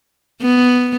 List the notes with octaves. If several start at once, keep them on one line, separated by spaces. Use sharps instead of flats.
B3